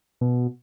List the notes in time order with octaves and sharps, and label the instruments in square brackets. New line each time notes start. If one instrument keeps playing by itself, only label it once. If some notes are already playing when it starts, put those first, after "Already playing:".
[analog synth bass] B2